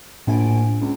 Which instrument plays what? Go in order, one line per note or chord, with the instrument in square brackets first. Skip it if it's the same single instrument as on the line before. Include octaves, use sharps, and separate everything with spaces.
[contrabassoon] A#1 [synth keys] A2 G#5 D7
[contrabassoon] C#2